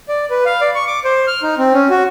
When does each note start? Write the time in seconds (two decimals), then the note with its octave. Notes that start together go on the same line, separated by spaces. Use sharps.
0.09 D5
0.30 B4
0.46 F5
0.61 D5
0.75 C#6
0.87 D6
1.04 C5
1.27 F6
1.43 D#4
1.58 C4
1.73 C#4
1.90 F#4